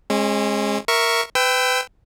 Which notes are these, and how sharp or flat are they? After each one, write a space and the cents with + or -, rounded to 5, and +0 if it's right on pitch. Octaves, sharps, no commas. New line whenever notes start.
G#3 +0 C#4 -40
A#4 +0 E5 +0 C#6 +0
B4 +35 G5 +0 E6 +0